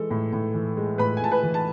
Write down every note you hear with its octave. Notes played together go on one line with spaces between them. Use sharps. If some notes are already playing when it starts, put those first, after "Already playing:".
Already playing: E3 G#3 A4
A2
A2
E3
G#3
A2 B4 B5
G#5
A2 A5
B4 B5
E3
A5